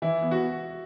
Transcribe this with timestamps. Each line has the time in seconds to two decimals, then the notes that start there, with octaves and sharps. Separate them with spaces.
0.02 E3 E4
0.22 B3
0.31 F#4